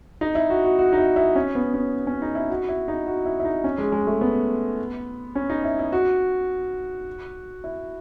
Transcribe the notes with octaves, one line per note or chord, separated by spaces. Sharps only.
D#4
E4
F#4
F#4
F#4
D#4
E4
E4
C#4
B3
C#4
C#4
D#4
E4
F#4
E4
D#4
F#4
E4
E4
D#4
C#4
G#3
G#3
A3
B3
C#4
D#4
E4
E4
F#4
E4